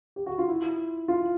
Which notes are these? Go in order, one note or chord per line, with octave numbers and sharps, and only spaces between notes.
G4
F#4
F4
E4
F4